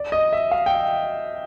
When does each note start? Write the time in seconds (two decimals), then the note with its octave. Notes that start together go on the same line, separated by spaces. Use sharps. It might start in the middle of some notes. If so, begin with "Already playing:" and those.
Already playing: D5
0.12 D#5
0.33 E5
0.52 F5
0.66 G5